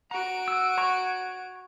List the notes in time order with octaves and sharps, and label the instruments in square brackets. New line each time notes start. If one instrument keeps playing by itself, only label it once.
[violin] F#4 D7 [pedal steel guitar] A#5
[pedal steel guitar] E6
C#5 A#5 C#6